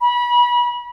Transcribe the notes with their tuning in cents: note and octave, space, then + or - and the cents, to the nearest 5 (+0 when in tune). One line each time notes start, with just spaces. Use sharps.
B5 -30